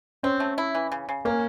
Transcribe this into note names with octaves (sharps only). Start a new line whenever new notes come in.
C4 C#4
A3
E4
E3
C#3
C#3
A#3 C#4